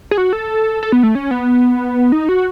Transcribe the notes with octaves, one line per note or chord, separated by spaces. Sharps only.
G#4
F#4
A4
A4
B3
A3
C#4
B3
D#4
F#4